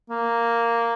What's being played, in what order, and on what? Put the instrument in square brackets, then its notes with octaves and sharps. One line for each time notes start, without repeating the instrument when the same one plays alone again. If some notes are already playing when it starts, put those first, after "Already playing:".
[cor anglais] A#3